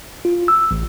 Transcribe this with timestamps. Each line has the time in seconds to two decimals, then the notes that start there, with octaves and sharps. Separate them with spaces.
0.25 F4
0.48 E6
0.71 A1